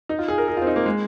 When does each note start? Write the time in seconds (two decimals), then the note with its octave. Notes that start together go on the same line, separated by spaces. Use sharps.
0.09 D#4
0.19 F4
0.28 G#4
0.38 A#4
0.48 G#4
0.57 C4 F4
0.67 D#4
0.76 A#3
0.86 G#3